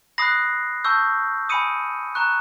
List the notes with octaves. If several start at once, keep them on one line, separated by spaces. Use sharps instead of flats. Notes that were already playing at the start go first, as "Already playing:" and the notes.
B5 D#6 F#6 A#6 C7
A5 C#6 E6 G6
G#5 B5 D#6 C#7 D#7
A#5 C#6 F#6